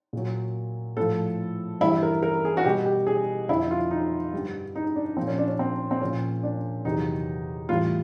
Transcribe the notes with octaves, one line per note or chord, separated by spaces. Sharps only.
A#2 F#3
A2 F3 A4
G2 E3 G3 E4
A#4
A#4
G#4
F#4
B2 G3 G4
G4
G#4
F2 D3 F3 E4
F4
D#4
G2 D3 G3
D#4
D4
F3 C4
A#2
C#4
D4
C#4
C4
C4
A#2 F3 C#4
D4
E2 C3 D#3 F#3 D#4
A2 E3 G3 F4